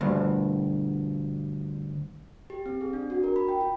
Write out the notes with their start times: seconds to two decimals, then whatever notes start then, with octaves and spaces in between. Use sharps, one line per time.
0.01 D2 G2
2.50 G4
2.66 C4
2.81 G#4
2.93 D4
3.10 F#4
3.24 A#4
3.36 B5
3.49 G5
3.61 F4